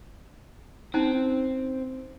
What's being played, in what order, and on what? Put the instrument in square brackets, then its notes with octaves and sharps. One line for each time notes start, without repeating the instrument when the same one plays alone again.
[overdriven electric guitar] C4 [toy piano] C#4 D#4